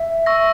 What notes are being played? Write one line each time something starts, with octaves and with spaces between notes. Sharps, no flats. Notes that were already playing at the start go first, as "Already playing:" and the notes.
Already playing: E5
C#6 E6 A#6